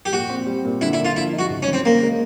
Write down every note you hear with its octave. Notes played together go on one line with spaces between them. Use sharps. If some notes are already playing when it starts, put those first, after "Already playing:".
G4
A#2 F#4
C4
G3
A#2
D3 E4
E4
A#3
F4
F3 E4
D#4
F#4
C#2
C#4
E3
C4
C#3 A#3
G#3